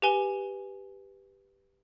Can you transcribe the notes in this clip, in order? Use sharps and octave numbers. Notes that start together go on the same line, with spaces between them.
G4 B4 G#5 G7